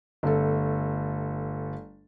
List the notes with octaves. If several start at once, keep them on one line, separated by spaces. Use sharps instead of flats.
G1 A3 A4